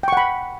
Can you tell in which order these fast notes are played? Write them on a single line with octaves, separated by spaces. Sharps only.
G5 C#6 F#5 B5